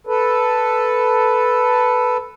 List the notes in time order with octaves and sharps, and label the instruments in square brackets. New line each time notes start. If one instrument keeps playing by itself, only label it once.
[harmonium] A4 B4